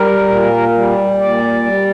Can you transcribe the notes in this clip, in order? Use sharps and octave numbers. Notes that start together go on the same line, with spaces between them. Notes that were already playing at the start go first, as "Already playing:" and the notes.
Already playing: G3 A#4
A#2
G3
A#2 D5
G3